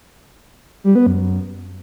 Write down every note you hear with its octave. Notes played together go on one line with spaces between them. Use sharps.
G3
B3
F#2